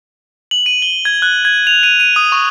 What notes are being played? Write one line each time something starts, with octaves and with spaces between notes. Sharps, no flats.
F#7
D#7
G7
G#6
F#6
G#6
F7
D#7
D#7
D#6
C#6